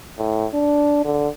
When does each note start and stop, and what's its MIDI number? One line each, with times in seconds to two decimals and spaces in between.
0.18 0.47 45
0.54 1.02 62
1.05 1.28 50